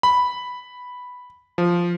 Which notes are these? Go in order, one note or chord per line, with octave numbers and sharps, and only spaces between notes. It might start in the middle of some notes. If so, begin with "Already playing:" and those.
B5
F3